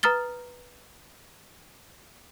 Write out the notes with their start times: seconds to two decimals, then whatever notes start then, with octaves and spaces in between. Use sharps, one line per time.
0.03 B4 A#5 D#6 F6 A6 G7